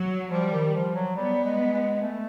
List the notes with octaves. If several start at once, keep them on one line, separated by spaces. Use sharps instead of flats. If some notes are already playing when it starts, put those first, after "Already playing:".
Already playing: F#3
F3 G3
D#3
F3
F#3
G3 B3
G#3
G#3
A3